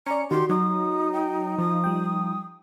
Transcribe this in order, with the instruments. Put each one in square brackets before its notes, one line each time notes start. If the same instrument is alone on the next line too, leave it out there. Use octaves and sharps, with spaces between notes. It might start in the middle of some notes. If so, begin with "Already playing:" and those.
[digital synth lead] C#4 [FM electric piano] D5 C#7 [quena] A#5
[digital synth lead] D#3 [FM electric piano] F#4 [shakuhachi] G4 [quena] C6
[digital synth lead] F#3 [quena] D#4 [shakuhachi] D#6
[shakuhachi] G5
[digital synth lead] F3 [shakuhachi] D#6
[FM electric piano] G3 G5